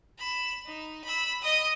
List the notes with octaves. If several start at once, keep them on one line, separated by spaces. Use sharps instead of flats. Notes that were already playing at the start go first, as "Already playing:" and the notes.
B5 E7
D#4
B5 E6
D#5 D#6